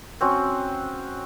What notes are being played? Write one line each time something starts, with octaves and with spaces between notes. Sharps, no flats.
C4 C#4 F#4